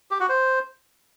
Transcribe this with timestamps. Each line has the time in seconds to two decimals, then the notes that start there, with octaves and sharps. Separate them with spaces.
0.11 G4
0.20 F#4
0.29 C5